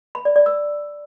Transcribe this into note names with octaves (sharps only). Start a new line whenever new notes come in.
B5
D5
D5
E6